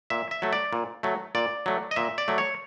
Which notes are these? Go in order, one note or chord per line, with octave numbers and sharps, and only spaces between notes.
A#2 E5
E5
F#3 A3
D5
A#2
F#3 A3
A#2 D5
F#3 A3
D#5
A#2 E5
D5
F#3 A3
C#5